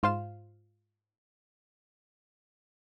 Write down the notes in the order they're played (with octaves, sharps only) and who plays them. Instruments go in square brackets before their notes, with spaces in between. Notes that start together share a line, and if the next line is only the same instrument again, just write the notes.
[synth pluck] G#2 F4 C5 F5 E7